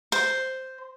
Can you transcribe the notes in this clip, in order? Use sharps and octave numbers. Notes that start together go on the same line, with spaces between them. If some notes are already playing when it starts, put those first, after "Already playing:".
C5